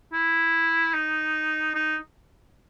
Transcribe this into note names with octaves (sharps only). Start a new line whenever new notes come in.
E4
D#4
D#4